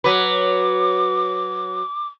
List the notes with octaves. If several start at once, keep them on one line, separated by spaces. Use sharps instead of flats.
F#3 B4 D6